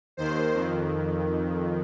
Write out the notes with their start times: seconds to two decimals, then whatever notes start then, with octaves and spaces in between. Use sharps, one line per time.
0.17 D#2 D#3 C5
0.54 F2 D#3